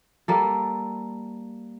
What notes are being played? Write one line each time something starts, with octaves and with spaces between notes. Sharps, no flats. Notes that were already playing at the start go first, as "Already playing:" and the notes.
G3 A#3 A4